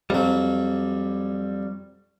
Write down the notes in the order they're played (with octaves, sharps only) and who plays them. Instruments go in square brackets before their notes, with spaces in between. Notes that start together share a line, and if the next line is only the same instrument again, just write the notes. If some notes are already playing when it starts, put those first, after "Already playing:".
[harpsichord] F2 F#3 [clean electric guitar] G3